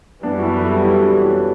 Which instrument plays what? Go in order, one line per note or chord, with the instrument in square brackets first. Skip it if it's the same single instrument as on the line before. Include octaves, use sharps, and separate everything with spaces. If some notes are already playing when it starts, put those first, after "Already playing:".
[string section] F#2 E3 G3 [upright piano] B3 D4
[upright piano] F#4
E4 G4
B4
F#4 A4
A4
E4 G4
G4
D4 F#4
C#4 E4